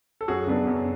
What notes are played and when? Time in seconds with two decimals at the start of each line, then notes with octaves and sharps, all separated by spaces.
0.21 A4
0.28 F#2 F#4 G#4
0.47 C#3 F#3 B3 D4
0.67 F#2